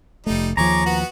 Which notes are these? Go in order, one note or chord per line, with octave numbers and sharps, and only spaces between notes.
F1 G3 A3 D#4
D#2 F3 G#4 C#5 A#5 D6
B3 F#4